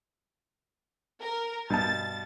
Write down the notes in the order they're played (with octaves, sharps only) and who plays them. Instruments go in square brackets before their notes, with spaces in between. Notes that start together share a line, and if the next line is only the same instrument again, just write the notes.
[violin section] A#4
[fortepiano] G2 B2 A5 [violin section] A6